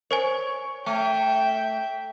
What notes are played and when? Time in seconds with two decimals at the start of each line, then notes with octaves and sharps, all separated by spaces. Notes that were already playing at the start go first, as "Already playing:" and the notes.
0.11 A#4 C5 C#5 G#5
0.86 A3 E5 G5